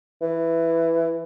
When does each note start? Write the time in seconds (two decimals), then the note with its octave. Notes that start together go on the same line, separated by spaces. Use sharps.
0.21 E3